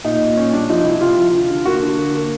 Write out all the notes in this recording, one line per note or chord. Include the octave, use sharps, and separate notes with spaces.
A#2 D#4
A#2
A#2 C#4
G3 D4
F3 D#4
C3 E4
C3 F4
F3
D3
D3
A#3 F#4
D3
A#3
A#3